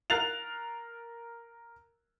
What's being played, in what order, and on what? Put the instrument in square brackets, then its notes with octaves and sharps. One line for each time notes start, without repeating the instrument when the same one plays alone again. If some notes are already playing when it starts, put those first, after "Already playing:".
[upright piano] A#4 F#6 A6 C7 F7